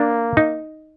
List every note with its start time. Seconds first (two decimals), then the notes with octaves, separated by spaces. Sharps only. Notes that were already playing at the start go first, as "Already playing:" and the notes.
Already playing: A#3 D4
0.37 D#4